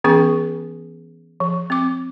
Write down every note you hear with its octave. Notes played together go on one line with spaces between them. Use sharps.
E3 B3 C#4 G#4 G#5 C#6
F3
C4 D6